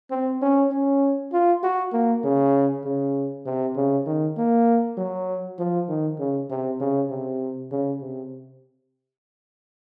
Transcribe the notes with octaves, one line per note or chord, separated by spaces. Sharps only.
C4
C#4
C#4
F4
F#4
A#3
C#3
C#3
C3
C#3
D#3
A#3
F#3
F3
D#3
C#3
C3
C#3
C3
C#3
C3